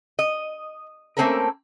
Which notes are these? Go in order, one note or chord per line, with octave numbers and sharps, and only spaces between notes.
D#5
A3 A#3 C4 C#4 A4 A#4